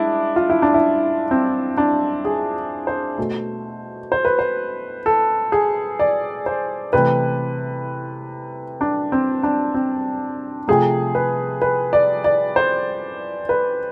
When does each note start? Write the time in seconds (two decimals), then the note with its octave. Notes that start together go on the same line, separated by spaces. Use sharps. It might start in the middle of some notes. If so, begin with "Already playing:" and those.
Already playing: G#3 D4 E4
0.36 F4
0.50 E4
0.62 D4
0.74 E4
1.31 C4
1.78 D4
2.25 G#4
2.87 C5
3.18 B2 A3
4.12 C5
4.25 B4
4.39 C5
5.06 A4
5.52 G#4
6.00 D5
6.46 C5
6.93 C3 E3 A3 B4
8.81 D4
9.12 C4
9.43 D4
9.74 C4
10.68 C3 F3 A3 G#4
11.15 B4
11.62 B4
11.93 D5
12.24 D5
12.56 C5
13.49 B4